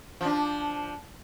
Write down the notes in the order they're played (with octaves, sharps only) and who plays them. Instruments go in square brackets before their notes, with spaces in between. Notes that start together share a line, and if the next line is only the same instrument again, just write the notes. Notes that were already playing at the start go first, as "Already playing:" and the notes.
[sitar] F3 D4